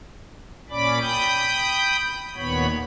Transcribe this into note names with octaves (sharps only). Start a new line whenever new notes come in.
A#2 C#4 D5 B5 D6
G5 B5 D#6 G6
D#2 A#2 B3 C#5 B5